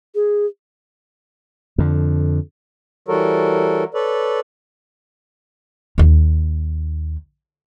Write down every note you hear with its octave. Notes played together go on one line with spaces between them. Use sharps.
G#4
F2 D3
E3 G3 F#4 A4 A#4 C#5
A4 B4 C#5 D5
D#2 D#4